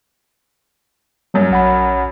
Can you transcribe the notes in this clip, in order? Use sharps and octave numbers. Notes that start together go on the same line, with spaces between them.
F#2 F#3 G3
A#1 F#5 B5